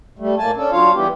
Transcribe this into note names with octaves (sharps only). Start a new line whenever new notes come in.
G3 A3
A2 A#3 G#5 A5
C#4 D4 A4
F#3 D4 F4 C#5 F5
E2 E3 G3 B3 G4